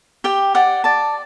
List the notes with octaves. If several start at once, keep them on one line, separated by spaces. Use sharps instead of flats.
G4 G5
D5 F#5
D5 A5